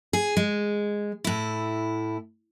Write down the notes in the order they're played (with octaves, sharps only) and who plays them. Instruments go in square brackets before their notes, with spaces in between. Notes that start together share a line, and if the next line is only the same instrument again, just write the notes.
[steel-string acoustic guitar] G#4
G#3
A2 E4